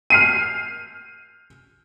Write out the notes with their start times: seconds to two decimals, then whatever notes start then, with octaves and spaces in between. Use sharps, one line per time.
0.10 F6 C7 D#7